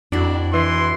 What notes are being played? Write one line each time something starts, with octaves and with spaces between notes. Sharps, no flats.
F2 D4 E4 F#4
E3 C6